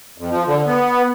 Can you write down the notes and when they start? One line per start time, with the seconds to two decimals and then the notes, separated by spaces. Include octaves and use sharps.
0.18 F2
0.30 F3
0.47 D3
0.66 B3